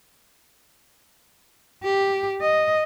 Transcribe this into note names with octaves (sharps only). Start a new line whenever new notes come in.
G4
D#5